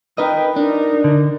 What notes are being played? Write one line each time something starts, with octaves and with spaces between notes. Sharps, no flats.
D#4 A#4 B4 D#5 G5
D4 D#4 A#4
D3